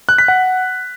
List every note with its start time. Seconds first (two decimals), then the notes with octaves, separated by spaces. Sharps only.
0.09 F#6
0.18 B6
0.28 F#5